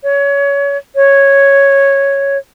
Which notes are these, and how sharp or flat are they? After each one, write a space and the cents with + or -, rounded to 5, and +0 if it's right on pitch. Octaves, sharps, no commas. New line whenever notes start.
C#5 +25
C#5 -5